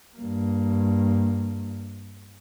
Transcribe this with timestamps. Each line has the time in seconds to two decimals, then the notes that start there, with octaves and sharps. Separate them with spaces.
0.16 G2 A#3